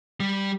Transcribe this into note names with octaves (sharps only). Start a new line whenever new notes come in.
G3